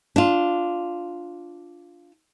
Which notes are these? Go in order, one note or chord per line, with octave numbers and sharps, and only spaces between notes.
D4 F4